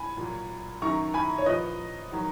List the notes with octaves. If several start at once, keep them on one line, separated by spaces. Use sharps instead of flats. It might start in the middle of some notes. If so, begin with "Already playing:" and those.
Already playing: G#5 B5
A#2 F#3
F#2 D#3 F#3 A#5 C#6
G#5 B5
C#5
A#2 F3 B4 D#5
D#3 F#3